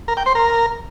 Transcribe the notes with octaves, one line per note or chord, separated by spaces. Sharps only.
A#4
G5
C5
A#4